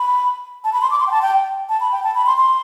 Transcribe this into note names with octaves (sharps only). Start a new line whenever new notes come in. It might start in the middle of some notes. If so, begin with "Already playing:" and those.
Already playing: B5
A5
B5
C6
D6
C6
G5
A5
G5
A5
B5
G5
A5
B5
C6
C6